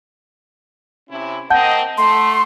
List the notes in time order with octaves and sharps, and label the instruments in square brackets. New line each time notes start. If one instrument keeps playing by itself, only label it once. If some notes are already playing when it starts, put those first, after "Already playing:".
[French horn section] C3 C#4 E4
[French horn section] A#3 C4 D#5 [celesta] F#5 A5 G6
[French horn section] A3 [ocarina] C6